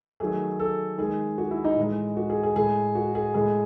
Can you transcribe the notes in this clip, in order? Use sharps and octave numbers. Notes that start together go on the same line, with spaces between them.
D#3 F#3 A3 G#4
A4
D#3 G#3 G#4
F#4
E4
D#4
A2 E3 G#3
F#4
G#4
G#4
A2 G#3 G#4
F#4
G#4
A2 G#3 G#4